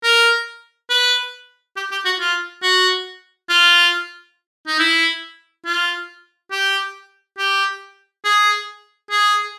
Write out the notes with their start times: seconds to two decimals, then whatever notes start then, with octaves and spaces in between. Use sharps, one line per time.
0.04 A#4
0.90 B4
1.76 G4
1.91 G4
2.05 F#4
2.20 F4
2.63 F#4
3.49 F4
4.67 D#4
4.79 E4
5.65 F4
6.51 G4
7.38 G4
8.25 G#4
9.10 G#4